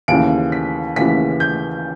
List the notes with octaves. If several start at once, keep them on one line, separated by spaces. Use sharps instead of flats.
D#2 C#3 E3 D7
B6
D#2 C#3 E3 B6
G6